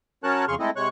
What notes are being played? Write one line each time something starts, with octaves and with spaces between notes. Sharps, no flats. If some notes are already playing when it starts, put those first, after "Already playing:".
F#3 C#4 A#4 C#5 A5 F#6
F2 C#3 G#4 C6 C#6 F6
G#3 A3 C4 E4 A4 D#5
C3 G#3 C#5 C#6 F#6